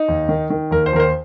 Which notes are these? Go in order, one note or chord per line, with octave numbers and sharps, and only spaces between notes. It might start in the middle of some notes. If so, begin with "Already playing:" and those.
Already playing: D#4
D#2
D#3
D#3
D#2 A#4
C5
D#2 A#4
C5